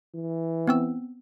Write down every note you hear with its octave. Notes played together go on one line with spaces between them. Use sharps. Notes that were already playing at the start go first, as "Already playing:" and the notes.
E3
B3 C4 E6